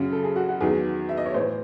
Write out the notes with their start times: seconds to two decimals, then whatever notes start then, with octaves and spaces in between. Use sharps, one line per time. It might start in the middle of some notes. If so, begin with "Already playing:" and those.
Already playing: F#2 C#3 F#3
0.12 A4
0.24 G#4
0.36 F#4
0.48 F#4
0.61 E2 D#3 F#3 G#4
1.09 E5
1.17 D#5
1.26 C#5
1.34 A2 E3 C5